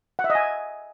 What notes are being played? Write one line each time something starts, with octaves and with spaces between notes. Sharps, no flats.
F#5
E5
D#5
G#5